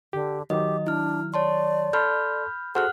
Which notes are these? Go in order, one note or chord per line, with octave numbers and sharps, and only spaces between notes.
D3 G4
D#3 F#3 G4 D#5
D4 E4 F6
C#5 D5 A5 C6
A4 A5 B5 C6 F6 G6
F#4 G#4 A4 C5 F#5 F6 F#6